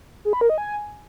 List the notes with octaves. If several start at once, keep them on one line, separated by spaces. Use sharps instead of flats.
G#4
B5
A#4
D#5
G#5